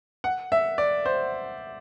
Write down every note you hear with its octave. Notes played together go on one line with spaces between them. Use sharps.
F#5
E5
D5
C5